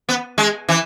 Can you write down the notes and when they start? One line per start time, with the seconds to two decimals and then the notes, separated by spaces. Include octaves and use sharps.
0.09 B3
0.38 G#3
0.69 E3